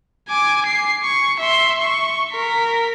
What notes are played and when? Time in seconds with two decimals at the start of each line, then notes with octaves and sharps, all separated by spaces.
0.29 G#5 D6
0.66 C7
1.04 C#6
1.40 E5 C6
1.80 C#6
2.32 A#4 B6